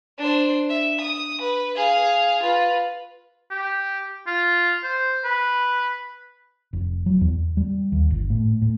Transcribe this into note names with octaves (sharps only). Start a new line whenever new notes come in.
D4 C5
E5
D#6
B4
G#4 F5
F4 B4
G4
F4
C5
B4
F1
F#3
E2
G3
D#2
G1
A2
A2